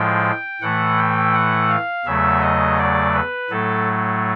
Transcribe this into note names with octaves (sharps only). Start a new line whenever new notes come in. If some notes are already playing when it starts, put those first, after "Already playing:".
Already playing: A2 F3 G#3 G5
A2 E3 A3 F#5
G5
F#5
F5
E2 C#3 F#3 A3 E5
D#5
D5
B4
A2 F#3 A3 A4